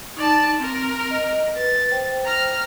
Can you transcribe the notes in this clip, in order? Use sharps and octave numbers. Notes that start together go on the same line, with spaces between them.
D#4 D5 A5
C4 A#4
D#5
B4 A6
C5 G5
A#5 F6